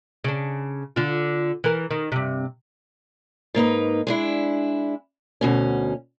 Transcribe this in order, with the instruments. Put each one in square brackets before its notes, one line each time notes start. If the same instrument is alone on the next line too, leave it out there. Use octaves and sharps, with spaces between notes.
[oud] C#3 D4
D3 F4
E3 A#4
D#3
G2 C3
[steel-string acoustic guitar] G#2 A#3 D#4 B4
G#3 D4 E4
D2 B2 C#4